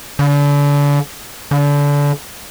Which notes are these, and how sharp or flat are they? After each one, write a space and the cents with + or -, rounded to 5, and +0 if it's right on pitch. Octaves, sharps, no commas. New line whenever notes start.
D3 -35
D3 -30